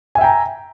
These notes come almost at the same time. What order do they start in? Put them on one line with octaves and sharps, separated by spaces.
G#5 E5 G5 A#5